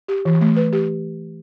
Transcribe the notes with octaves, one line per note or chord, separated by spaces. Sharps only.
G4
E3
A3
B4
G4